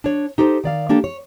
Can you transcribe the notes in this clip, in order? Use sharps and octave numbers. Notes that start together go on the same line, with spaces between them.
D4 C#5
D#4 G4 A4 B4 C5
D#3 D5 F5
A#3 D4 G4 A4
C#5